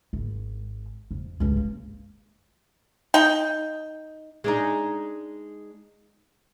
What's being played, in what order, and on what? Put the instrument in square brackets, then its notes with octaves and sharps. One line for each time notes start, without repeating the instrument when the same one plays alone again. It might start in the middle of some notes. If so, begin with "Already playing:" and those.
[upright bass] G#1
F2
C#2 G2
A#3
[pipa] D#4 G5
[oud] G#3 D4 D#4